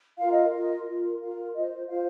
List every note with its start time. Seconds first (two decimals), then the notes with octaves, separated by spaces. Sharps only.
0.18 F4 A#4 F5
0.32 D#5
0.52 F4 A#4 D#5
0.86 F4 A#4
1.21 F4 A#4 F5
1.54 F4 C5 D#5
1.88 F4 C5 F5